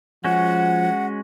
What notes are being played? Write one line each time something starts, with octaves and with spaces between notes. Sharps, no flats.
F3 G#3 C#4 F#4 F#5